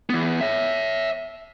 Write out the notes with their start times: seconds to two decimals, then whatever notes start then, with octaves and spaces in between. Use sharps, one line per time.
0.10 E3 B3
0.41 C#5 E5